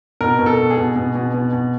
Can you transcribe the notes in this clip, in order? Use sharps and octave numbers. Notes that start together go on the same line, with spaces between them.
B2 A#4
B2
A4
B2
G#4
B2
B2
B2
B2
B2